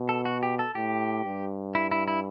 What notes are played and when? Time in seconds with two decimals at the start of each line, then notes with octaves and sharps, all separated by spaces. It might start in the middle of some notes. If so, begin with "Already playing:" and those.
Already playing: B2
0.09 A4
0.25 F#4
0.43 G4
0.59 A4
0.75 A2 G4
1.25 G2
1.75 E4
1.91 E4
2.08 E4